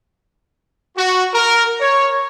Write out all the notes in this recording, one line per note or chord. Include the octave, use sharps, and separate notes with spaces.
F#4
A#4
C#5